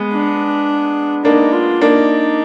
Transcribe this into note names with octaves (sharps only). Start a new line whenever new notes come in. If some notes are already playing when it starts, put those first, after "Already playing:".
Already playing: G#3 B3
D4
A#3 D4 D#4
F4
A#3 D4 D#4